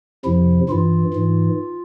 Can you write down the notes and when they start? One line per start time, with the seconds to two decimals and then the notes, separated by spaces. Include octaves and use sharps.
0.25 F2 C3 F3 E4
0.69 G2 E3 F4
1.13 G#2 E3